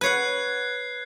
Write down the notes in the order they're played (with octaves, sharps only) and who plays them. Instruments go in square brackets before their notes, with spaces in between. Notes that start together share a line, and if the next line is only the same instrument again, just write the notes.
[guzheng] B4 C#5 F#5 [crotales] F#6 G#6 C7